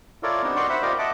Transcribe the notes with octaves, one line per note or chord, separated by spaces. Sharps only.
E4 F4 A4 A#4 C#5 D5
B3 C4 D4 D#4 G4 A#4
D#4 F#4 D5 G5 C6 C#6
C5 E5 F#5 B5
F4 G4 A#4 C5 D5 D#5
D#5 E5 F#5 A5 D6